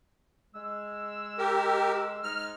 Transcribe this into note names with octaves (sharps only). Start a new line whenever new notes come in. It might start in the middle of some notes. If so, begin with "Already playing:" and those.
G#3 E6
G4 A#4
G#2 G#3 D#4 F6